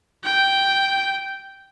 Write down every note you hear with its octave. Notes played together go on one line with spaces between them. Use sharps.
G5